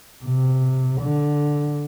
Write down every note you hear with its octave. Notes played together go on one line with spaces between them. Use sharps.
C3
D3